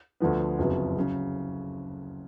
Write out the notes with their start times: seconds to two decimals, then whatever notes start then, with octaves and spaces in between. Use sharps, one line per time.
0.20 D2 D3 F3 B3
0.59 F#1 F2 C#3 F#3 B3
0.96 C#3 F#3